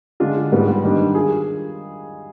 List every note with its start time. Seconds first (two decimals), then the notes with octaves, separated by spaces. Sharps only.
0.20 D3 G#3 D4 F4
0.52 G#2 G3 B3
0.83 D#3 G3 D4
1.15 F4 G#4